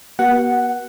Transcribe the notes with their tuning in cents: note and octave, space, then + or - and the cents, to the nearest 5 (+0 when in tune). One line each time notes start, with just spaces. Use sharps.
B3 -40 F#4 +40 F#5 +0